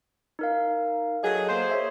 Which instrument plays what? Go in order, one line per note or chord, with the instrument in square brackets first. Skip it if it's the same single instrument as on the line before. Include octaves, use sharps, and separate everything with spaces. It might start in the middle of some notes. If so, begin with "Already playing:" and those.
[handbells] D#4 A#4 F5
[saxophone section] F#3 G#4 [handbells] A4 D#5
[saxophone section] A#3 C5
[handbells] G#4 C#5 E5